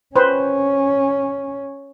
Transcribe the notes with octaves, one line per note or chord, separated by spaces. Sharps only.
C#4 B4 C5